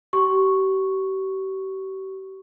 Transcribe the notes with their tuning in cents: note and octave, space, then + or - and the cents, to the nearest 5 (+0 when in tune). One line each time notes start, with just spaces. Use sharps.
G4 -40 C#6 +0